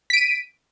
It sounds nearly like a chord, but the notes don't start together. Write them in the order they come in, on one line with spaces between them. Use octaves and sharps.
B6 D7 D#7